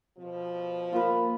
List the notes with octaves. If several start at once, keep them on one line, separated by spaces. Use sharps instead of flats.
B2 F3
A#3 F4 B4